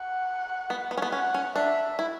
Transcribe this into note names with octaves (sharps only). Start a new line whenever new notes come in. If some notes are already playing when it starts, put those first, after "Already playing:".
Already playing: F#5
B3
B3
C#4
B3
C#4 F#5
C#4
D4 E5
E4